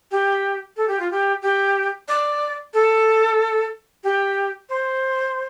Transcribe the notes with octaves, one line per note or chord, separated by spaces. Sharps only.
G4
A4
G4
F4
G4
G4
D5
A4
G4
C5